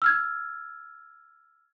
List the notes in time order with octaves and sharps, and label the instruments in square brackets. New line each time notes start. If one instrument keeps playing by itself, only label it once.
[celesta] E6 F6 G#6